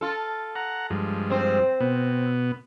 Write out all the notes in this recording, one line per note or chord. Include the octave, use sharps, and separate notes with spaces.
F4 A4
F#5 A#5
G2 F3 G#3
C4 C5
B2 B3